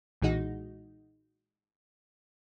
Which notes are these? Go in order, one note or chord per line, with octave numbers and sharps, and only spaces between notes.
B1 A#2 E3 G#3 D#4 F#4